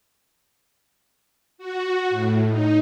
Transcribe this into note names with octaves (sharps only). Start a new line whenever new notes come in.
F#4
A2
D#4